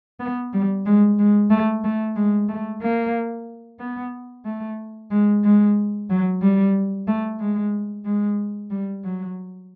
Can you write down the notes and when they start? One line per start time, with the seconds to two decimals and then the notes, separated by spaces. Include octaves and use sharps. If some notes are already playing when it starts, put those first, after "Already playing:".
0.20 B3
0.53 G3
0.86 G#3
1.19 G#3
1.51 A3
1.84 A3
2.16 G#3
2.49 A3
2.82 A#3
3.80 B3
4.45 A3
5.11 G#3
5.44 G#3
6.10 F#3
6.42 G3
7.08 A3
7.40 G#3
8.05 G#3
8.71 G3
9.04 F#3